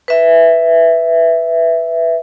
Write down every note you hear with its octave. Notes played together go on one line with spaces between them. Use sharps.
B4 E5